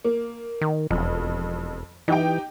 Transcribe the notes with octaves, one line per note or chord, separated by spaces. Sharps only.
A#3
D#3
E1 F2
E3 D#4 G4 G5